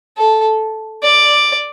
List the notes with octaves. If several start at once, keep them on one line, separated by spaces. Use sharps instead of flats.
A4
D5